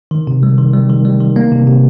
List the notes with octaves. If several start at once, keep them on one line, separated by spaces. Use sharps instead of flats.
D#3
C3
G3
D#3
G3
D#3
G3
D#3
A#3
C3
C3